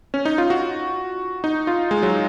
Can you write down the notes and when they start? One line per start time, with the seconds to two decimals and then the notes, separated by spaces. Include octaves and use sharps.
0.14 C#4
0.25 D#4
0.38 F4
0.50 F#4
1.44 D#4
1.67 F4
1.91 G#3
2.03 F#3